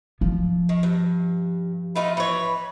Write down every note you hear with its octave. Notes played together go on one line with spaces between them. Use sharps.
F3
D#3
G2
A3 D#4 F4 B5
E3 C#5 B5